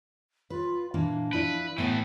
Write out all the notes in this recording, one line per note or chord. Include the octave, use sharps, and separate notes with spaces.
F4 B4
A#2 E3 A#3 D4
F3 E4 B4 D5
A2 E3 A3 B3